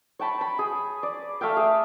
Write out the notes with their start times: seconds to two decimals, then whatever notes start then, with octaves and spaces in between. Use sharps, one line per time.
0.19 C#5 G5 A5 B5
0.41 B5
0.59 G#4
1.03 D5
1.41 A3 E5 F5 G5
1.57 G#4